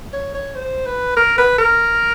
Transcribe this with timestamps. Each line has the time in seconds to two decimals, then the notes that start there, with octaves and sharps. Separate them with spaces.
0.13 C#5
0.34 C#5
0.55 C5
0.86 B4
1.17 A#4
1.38 B4
1.58 A#4